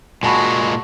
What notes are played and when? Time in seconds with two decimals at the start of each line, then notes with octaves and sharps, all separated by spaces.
0.23 A#2 G#3 F#4 G#5 A5 B5